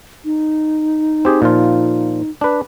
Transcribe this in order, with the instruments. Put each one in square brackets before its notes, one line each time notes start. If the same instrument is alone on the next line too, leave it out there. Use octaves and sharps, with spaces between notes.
[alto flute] D#4
[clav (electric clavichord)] C4 G4 G#4
A#2 F3 F4
D4 B4